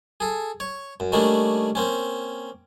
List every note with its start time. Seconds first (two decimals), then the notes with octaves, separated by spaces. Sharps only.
0.20 G#4 A4
0.60 C#5
1.00 F#2
1.12 D#3 G3 A3 A#3 C#4 D4
1.75 A#3 C4 C#4